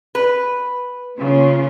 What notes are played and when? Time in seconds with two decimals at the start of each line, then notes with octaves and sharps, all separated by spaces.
0.15 B4
1.19 C#3 A#3 F4